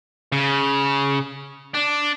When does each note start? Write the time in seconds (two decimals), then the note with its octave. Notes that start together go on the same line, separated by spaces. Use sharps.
0.32 C#3
1.74 D4